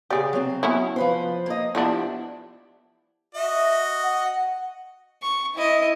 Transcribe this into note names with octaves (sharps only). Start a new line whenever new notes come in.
C#3 G4 G#4 D5
F#3 C4
B3 C#4 E4
F3 B4 C5
A#3 D#5
F3 B3 D4 E4 G4
F#4 D#5 E5
F#5
C#6
E4 D#5